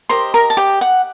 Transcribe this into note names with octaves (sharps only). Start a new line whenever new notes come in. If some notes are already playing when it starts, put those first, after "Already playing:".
G4 A#4 C5 D#5 C6
A#4 A#5
A5
G4 G5
F#5